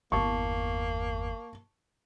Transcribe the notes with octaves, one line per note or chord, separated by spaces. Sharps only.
G1 E2 A#3 A5 C#6